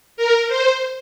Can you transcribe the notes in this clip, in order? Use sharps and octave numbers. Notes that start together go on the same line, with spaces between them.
A#4
C5